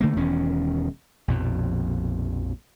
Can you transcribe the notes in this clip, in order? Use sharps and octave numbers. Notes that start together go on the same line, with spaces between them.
D3 A3 A#3
E1 E2 D#3 C#4
A#1 F2 B2